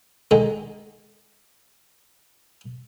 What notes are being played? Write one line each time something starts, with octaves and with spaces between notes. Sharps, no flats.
D3 D#3 G#3